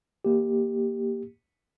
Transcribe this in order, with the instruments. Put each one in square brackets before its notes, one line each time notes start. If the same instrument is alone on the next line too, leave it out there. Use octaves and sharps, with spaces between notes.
[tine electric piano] A#3 G4